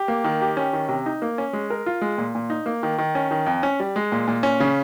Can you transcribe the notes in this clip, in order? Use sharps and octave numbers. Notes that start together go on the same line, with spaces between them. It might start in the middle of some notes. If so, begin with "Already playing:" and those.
Already playing: G4
A#3
D#3
G4
C#4
D#3
C3
D#4
A#3
C#4
G#3
A#4
F4
G#3
A#2
A#2
D#4
A#3
D#3
D#3
C#4
D#3
F2
C#4
G3
G#3
A#2
A#2
C#4
C#3